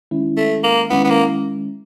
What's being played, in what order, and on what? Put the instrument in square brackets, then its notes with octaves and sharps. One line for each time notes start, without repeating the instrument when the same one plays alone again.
[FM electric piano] D#3 G#3 C#4 E4
[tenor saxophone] A3
A#3
[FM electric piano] D#3 G#3 C#4 E4 [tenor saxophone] B3
[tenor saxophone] B3
A#3